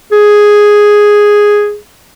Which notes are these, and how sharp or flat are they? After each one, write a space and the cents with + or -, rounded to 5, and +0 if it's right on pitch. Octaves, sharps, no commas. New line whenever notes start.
G#4 +0